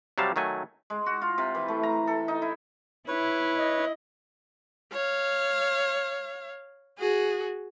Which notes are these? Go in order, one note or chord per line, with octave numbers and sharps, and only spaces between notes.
C3 F#3 G3 F5 A5
D#3 F#3 A3 G#5
G#3
F#4
F4
C3
E3
A3
A#5
A4
D#4
E4
E4 B4 C#5
D#5
C#5 F5
F#4 G#4